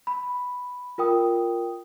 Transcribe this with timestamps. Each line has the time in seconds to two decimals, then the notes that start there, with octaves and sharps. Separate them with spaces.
0.07 B5
0.98 F4 A#4 G5 D#6